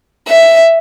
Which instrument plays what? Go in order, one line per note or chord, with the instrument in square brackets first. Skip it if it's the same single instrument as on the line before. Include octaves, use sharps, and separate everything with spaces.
[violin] E5